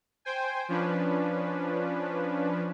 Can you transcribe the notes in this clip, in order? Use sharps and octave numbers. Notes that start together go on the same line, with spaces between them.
C5 G5 G#5
F3 C#4 D4 B4